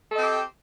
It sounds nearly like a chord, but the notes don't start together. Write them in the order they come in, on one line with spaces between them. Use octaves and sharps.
A4 D#5 C4 G4